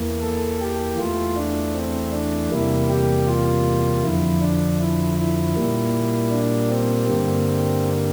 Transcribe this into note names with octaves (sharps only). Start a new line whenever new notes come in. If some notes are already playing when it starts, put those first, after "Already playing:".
Already playing: E2 E3 A#3
A4
G4
E2 E3 A3 F4
D4
C4
D4
E2 C3 G3 A#3 E4
G4
F4
F2 D3 F3 E4
D4
E4
E4
A#2 G3 A#3
D4
C4
G2 D3 G3 A#3